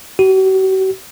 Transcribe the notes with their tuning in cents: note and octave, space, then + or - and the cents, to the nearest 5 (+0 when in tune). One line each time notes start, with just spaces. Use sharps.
F#4 +45